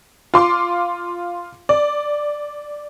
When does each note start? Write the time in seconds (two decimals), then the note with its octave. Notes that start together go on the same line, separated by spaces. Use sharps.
0.34 F4 C6 D6
1.69 D5